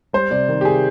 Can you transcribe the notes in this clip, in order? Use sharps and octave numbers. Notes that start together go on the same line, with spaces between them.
G3 C5
C3 D5
D#3
G4
C3 G#4